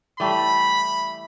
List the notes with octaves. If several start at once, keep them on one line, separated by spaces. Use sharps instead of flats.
E3 G3 A3 B5